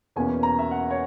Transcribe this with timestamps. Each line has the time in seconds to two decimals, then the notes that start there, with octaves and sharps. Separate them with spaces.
0.16 E2 B2 A#3 C#4 G#5
0.43 A#5
0.59 E5
0.71 F#5
0.90 C#5